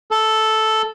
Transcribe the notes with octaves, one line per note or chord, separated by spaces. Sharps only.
A4